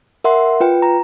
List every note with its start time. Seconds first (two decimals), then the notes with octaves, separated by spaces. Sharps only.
0.24 A#4 E5 F#5 C6
0.60 F4 B4 G5
0.82 A#5